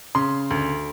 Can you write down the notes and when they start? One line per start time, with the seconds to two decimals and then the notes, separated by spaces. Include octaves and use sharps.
0.15 C#3 C6
0.51 D2